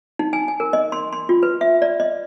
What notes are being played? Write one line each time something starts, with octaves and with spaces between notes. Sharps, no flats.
D#4
G#5
G#5
A#4
D#5
C6
C6
F4
B4
E5
D5
D#5